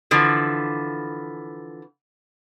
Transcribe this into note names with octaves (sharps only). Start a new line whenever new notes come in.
D3 E3 F3